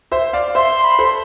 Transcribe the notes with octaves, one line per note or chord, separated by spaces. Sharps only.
C5 E5
D5 F5
C5 E5 C6
B5
A4 C5
C6